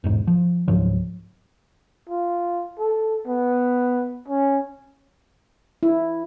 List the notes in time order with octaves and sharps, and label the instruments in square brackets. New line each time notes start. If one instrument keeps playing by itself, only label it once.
[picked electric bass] E1 A1 G#2
F3
C#2 G#2 F3 F#3
[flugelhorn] F4
A4
B3
C#4
[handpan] E4